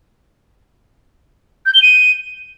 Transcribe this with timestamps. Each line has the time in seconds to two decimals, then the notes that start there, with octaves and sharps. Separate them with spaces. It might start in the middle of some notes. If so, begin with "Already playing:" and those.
1.66 G6
1.74 G7
1.82 D#7